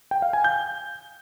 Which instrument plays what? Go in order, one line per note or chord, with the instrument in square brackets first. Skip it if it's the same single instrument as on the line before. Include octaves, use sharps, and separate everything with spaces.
[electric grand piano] G5
F5
G#5
G6